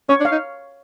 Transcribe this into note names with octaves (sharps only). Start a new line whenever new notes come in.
C#4 C#5
D4
F5
D#4